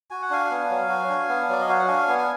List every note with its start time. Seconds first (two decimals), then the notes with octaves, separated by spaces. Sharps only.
0.11 F#4 G#5
0.22 F#5
0.30 D4 F5 G#5
0.51 B3
0.70 F#3
0.89 F#4
1.10 D4
1.29 B3
1.49 F#3 D5
1.61 D#5
1.69 F#4 F5
1.79 F#5
1.88 D4 F5 G#5
2.08 B3
2.18 G#5